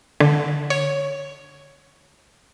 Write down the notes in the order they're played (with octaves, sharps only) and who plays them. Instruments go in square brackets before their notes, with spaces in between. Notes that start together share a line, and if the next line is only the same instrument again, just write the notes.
[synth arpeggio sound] D3
C#5